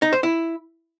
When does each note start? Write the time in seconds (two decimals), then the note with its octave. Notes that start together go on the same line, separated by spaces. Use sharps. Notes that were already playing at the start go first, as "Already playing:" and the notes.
0.02 D#4
0.13 C5
0.23 E4